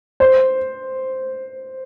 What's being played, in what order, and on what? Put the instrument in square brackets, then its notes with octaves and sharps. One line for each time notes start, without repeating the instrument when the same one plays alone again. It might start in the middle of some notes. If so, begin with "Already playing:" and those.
[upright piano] C5